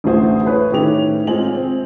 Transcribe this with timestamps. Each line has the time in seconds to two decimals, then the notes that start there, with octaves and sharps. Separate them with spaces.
0.04 A1 D2 G3 F#4 G#4 C5
0.46 G#4 B4 C#5
0.72 A2 D#3 C#4 G4 C#5 F7
1.27 G#3 C4 F4 G#5 F#7
1.55 C4